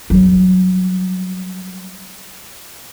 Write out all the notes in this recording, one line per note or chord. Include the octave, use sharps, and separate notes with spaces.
F#3 G3